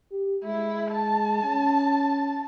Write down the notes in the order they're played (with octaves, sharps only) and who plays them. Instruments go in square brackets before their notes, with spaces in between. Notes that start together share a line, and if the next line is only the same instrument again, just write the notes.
[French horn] G4
[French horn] G#3 [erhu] E4
[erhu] A5
[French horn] C#4